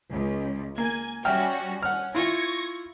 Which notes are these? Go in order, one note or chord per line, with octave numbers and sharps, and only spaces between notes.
C#2
A#3 G#5 G#6
G3 C#4 F#4 E5 G5 F6
C#4 F#5 F6
E4 F4 C#6 G#6 A#6